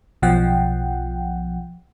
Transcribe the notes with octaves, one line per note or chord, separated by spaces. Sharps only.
B1 B2 F3 F#5 G5